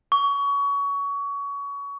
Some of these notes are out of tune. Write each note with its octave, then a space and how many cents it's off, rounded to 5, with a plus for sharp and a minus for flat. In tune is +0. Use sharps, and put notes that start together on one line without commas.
C#6 +25